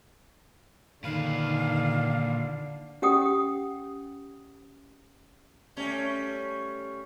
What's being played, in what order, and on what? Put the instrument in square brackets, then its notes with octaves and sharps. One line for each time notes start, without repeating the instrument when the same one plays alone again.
[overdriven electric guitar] A#2 B4 [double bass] D3 [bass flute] D#3 [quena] F5
[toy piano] C#4 G4 F#5 G5 D#6
[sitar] G3 A3 C#4